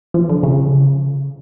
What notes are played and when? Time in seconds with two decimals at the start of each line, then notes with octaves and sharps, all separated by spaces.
0.14 F3
0.29 D3
0.43 C#3